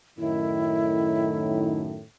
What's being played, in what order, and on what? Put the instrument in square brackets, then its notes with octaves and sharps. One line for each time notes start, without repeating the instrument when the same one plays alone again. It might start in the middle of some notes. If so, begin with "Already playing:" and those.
[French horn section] F#2 A2 D#3 [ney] E4